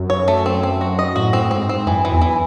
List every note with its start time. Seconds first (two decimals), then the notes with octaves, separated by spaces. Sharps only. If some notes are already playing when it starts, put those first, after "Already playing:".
Already playing: F#2
0.10 C#5
0.28 A3
0.46 C4
0.63 C4
0.81 F#4
0.99 D#5
1.16 A2 F#4
1.33 A2 C4
1.51 G#2 C4
1.69 C4
1.87 F#2 E3
2.05 E3
2.12 E2
2.22 E3